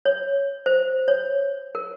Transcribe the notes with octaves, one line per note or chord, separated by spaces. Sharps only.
C#5
C5
C#5
A#4